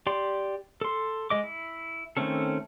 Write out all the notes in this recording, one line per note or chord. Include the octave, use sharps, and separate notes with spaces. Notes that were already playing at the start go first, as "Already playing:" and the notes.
G4 D5 C6
A4 C6
G#3 D#5 D6
E4
D#3 A3 C4 C#4 A4